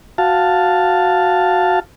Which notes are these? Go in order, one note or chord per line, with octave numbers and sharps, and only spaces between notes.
F#4 F5 A5